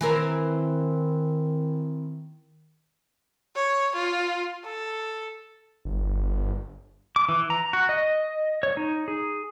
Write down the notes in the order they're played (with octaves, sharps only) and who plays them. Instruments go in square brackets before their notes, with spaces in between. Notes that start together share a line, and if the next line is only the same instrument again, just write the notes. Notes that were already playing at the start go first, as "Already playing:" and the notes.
[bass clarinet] D#3 [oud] E3 C4 A#4
[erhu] C#5
F4
A4
[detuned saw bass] G1
[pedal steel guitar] D6
E3
A#5
F#4
D#5
C#5
D#4
G#4